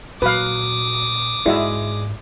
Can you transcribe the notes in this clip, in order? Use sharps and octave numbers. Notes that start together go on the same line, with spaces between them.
A#2 F#3 B4 F5 D6 D#6
G#2 G#3 E4 F#4 D5 E5